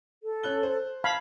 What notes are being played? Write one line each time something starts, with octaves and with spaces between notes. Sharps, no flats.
A4
C#4 F#6 G7
C5
F5 A5 B5 G#6